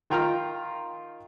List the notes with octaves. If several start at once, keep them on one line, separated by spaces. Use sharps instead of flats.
D#3 F4 G5 A#5 F6